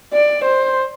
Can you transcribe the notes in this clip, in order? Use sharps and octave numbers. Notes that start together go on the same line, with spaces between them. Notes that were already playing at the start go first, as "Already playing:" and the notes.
D5
C5